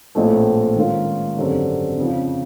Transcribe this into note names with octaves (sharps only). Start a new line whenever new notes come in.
A#1 A2 F3 A3 C4
D#3 G#3 C#4 F4 A#4
G#1 F#2 D3 G3 C4
F2 C#3 F3